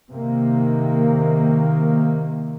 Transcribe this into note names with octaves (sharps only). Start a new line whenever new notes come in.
C3 D#3 A#3